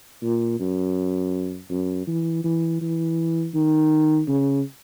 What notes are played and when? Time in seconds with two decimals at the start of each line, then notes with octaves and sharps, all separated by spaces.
0.23 A#2
0.60 F#2
1.70 F#2
2.07 E3
2.44 E3
2.81 E3
3.54 D#3
4.28 C#3